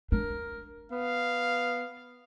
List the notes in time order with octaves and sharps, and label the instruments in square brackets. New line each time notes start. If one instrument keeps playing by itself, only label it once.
[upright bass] D4 [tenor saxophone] A#4
[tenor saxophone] B3 [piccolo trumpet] F5